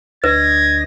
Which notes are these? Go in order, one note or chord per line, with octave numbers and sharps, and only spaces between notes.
D2 D4 B4 D#5 G#6 A#6